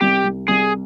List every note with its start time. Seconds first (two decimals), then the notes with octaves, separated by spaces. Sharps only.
0.01 C2 G4
0.25 C2
0.48 C2 G#4